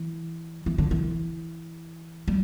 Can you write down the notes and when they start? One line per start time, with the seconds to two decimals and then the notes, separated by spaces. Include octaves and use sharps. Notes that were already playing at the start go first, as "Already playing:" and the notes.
Already playing: E3
0.66 E3
0.78 D3
0.91 E3
2.28 G3